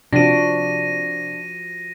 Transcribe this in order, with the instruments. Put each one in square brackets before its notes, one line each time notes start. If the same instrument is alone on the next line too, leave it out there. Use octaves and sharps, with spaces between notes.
[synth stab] C3 [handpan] F3 F#4 [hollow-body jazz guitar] D4 [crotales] A#6 D#7